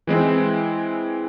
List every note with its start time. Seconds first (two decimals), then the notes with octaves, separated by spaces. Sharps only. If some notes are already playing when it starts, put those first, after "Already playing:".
0.07 E3 G#3 C4 E4